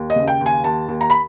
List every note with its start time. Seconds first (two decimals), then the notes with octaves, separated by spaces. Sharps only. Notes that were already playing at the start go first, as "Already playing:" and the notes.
Already playing: D#2
0.10 D#5
0.16 C#3
0.28 G5
0.41 D#2
0.46 G#5
0.64 D#2 A5
0.88 D#2
1.01 A#5
1.10 B5